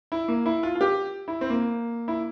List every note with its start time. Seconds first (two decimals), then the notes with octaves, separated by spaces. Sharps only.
0.12 E4
0.28 A#3
0.46 E4
0.63 F4
0.75 F4
0.81 G4
1.28 E4
1.41 C4
1.50 A#3
2.08 E4